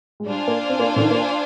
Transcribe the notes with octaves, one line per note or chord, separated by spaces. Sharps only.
G#3
G3 D4 F4 C5 F5 G#5
A#3
C4
A#3
D3
D#3
A#3